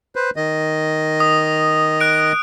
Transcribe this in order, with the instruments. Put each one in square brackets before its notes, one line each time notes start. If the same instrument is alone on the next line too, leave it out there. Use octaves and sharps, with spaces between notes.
[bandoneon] B4 C5
D#3 D#5
[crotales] D#6
F#6 D7